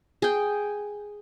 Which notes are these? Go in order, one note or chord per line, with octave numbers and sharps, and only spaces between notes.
G#4 G5